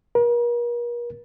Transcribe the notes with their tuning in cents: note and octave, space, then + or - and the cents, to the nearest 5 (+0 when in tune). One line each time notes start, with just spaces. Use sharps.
A#4 +40